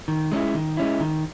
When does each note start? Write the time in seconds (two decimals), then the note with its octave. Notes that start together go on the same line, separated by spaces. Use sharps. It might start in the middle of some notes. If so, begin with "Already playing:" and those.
0.08 D#3
0.32 G#3 C#4 E4
0.54 D#3
0.77 G#3 C#4 E4
1.00 D#3